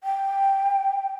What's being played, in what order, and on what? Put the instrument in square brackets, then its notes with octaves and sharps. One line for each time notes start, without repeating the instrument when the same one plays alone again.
[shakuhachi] G5